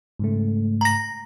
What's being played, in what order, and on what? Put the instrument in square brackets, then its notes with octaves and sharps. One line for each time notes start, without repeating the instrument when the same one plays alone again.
[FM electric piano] G#2 C#3 A3
[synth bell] A#5 A#6